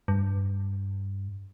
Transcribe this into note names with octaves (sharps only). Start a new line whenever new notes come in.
G2